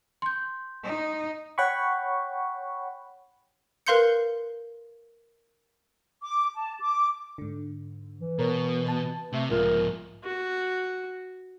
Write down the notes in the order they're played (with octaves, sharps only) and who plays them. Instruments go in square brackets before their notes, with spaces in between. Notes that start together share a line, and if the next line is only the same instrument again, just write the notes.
[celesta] C6 G6
[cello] D#4
[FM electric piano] C#5 F#5 G5 B5 C#6
[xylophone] A#4 B4 F5 C6 G6 C#7
[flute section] D6
A5
D6
[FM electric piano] G#2 D3
[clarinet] E3
[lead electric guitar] B2 [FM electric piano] A#4 C#5
[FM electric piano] B4 A5
[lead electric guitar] C3 [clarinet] A3
[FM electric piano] B1 F4 E5 [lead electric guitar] G#2 F3 [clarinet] A#4
[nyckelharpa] F#4